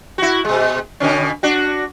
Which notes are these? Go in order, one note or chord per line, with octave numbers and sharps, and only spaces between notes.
E4 F#4
B2 G#3
B2 D3 C#4
D4 F#4